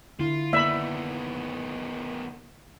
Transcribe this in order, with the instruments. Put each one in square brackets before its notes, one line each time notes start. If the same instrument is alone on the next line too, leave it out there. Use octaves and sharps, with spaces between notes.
[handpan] D3 E4 [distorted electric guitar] F4
[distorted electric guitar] D#3 B3 [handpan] A#3 D5 [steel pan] E5 B5